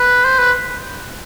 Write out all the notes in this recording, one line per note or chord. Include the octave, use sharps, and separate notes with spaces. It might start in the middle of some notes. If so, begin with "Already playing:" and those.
Already playing: B4
C5
B4